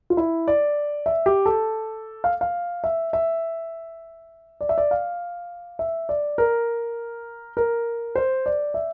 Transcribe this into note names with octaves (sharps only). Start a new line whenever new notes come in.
F4
E4
D5
E5
G4
A4
F5
F5
E5
E5
D5
E5
D5
F5
E5
D5
A#4
A#4
C5
D5
E5